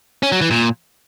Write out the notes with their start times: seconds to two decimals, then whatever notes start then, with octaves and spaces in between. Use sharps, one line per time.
0.23 C#4
0.32 F#3
0.41 E3
0.51 A#2